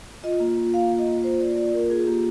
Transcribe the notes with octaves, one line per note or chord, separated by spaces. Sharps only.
F4 D#5
A#3
F4
A#3 F5
F4
D#5
A#3
F4 C5
A#3 D5
F4 D5
A#3 A#4
F4 G#4
A#3 G4